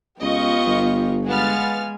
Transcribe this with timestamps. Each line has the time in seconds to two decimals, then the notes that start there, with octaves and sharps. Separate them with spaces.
0.22 C#2 B3 F4 G4 D#5 F5 C#6
0.66 G1
1.27 G#3 B3 F5 G#5 F6 A6